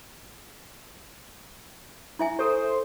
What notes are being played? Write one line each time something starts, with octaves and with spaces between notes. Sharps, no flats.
E4 E5 G#5
G4 A4 C5